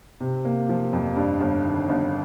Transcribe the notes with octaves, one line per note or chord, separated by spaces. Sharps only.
C3
A#3
F3
F2
G2
G1
D#3
G1